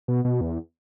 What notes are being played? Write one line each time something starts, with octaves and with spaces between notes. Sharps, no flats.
B2
B2
E2